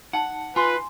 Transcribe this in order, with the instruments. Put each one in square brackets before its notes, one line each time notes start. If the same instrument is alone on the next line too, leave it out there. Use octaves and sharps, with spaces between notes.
[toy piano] D#4 A5 [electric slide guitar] F#5
[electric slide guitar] F4 [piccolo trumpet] B4 [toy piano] G#5 C6